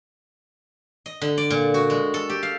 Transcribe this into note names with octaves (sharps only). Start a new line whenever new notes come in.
D#5
D3
D5
A#2
F#4
G#3
A4
G4
F5